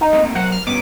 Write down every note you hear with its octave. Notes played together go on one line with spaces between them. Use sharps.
D#4
A3 A#3 C4
F#3 A#4 C5 F#5
F6
G2 B3 C#4 D6